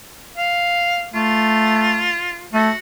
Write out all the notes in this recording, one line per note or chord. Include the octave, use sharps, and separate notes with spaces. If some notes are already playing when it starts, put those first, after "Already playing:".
F5
A3 F4
A3 F#4